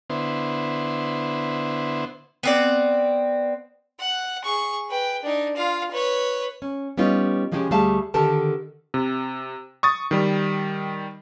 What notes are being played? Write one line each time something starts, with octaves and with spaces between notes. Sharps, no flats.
D3 B3 E4 C5
B3 C4 D5
F#5
G#4 C#6
B4 G5
D4 D#4
F4 F5
B4 C#5
C#4
G3 B3 C#4 D#4 F4
C3 F3 G#3 C#4 F#4 G4
D2 G3 A3 G#4 F5 A5
D3 D#3 G4 A4 A#4 A5
C3
C#6 D#6 A6
D#3 G3